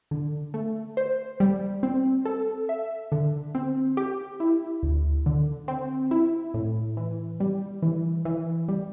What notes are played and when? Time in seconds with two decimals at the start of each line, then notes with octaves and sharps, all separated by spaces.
0.11 D3
0.54 A3
0.97 C5
1.40 G3
1.83 C4
2.25 A4
2.69 E5
3.12 D3
3.55 C4
3.97 G4
4.40 E4
4.83 D2
5.26 D3
5.68 C4
6.11 E4
6.54 A2
6.97 E3
7.40 G3
7.82 E3
8.25 E3
8.68 G3